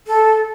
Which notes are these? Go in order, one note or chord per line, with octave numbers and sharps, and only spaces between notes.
A4